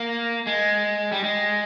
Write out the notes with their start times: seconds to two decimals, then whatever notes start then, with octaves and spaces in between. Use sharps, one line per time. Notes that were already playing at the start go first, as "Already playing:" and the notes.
Already playing: A#3
0.47 G#3
1.12 G3
1.24 G#3